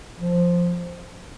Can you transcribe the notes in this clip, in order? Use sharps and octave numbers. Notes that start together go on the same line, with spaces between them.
F3